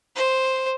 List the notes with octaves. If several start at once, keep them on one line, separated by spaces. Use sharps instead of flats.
C5